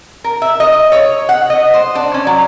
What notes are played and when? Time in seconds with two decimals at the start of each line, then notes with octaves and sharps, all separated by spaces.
0.24 A#4
0.42 E5
0.60 D#5
0.92 C#5
1.29 F#5
1.50 D#5
1.74 C5
1.95 D4
2.14 C#4
2.27 F#3